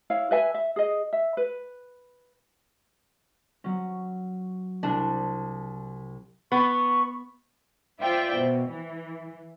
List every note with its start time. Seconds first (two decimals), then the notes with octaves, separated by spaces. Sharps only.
0.10 E4 C#5 F5
0.31 B4 E5 G#5
0.54 E5
0.76 G#4 D#5
1.13 E5
1.37 B4
3.64 F#3 C#4
4.83 C2 D4 F#6
6.52 B3 C#6
8.02 F4 C5 D5 E5 G5
8.35 B2
8.69 E3